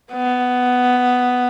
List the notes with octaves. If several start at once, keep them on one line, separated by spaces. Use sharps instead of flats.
B3